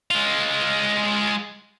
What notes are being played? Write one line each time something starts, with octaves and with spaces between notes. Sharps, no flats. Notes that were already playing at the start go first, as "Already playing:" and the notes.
G#3 F4